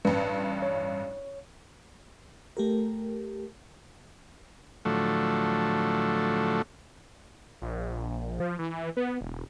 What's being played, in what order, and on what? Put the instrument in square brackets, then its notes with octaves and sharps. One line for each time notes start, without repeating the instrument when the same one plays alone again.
[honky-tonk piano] A1 G2 [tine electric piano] B4
[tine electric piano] C#5
[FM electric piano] A3 G4 A#4
[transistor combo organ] A2 D3 F3 F#3 A3
[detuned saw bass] A#1
F3
E3
B3
E1